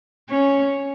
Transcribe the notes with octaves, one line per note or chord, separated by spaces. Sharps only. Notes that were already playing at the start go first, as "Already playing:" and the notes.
C#4